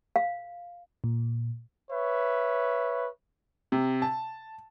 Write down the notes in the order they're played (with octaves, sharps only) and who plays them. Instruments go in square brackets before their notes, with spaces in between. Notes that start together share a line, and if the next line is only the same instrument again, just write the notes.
[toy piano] F5
[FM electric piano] A#2
[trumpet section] B4 C#5 E5
[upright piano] C3
A5